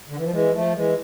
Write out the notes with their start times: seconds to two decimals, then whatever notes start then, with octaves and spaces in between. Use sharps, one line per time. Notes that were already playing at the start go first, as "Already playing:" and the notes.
0.09 D3
0.17 E3
0.24 F3
0.32 E3 G#3
0.53 F3 A3
0.75 E3 G#3